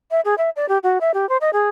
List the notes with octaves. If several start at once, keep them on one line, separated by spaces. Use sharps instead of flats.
E5
G#4
E5
D5
G4
F#4
E5
G4
C5
D#5
G#4